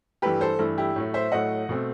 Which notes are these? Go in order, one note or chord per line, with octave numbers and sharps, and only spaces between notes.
G2 E3 A3 G4 B4
A4 C5
G2 E3 A3
E4 G4
A2 F#3 A3
C5 E5
A2 F#3 A3 D#5 F#5
B2 A3 C4